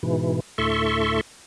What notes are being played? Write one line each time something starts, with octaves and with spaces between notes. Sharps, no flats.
G#2 B2 E3
D2 A2 A4 E5 C6 C#6